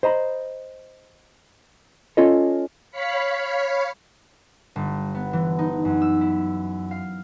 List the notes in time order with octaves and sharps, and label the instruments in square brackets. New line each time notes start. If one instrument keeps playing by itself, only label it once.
[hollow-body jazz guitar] C5 D#5 A#5 B5
C#4 F4 A4 C#5 D#5
[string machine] C#5 F5 B5 B6 C#7
[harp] G1
B3
E3
D#4
F#2
E6
E4
F5